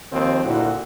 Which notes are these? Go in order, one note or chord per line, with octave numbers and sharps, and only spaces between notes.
D#2 D#3 F3 C4
D2 A#2 E4 F#4